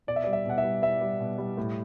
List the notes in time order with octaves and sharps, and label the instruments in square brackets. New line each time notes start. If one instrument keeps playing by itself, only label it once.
[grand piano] B2 D5
E5
D5
G3
E5
B2 F#5
E5
G3
G3 E5
G3
B2
G3
A2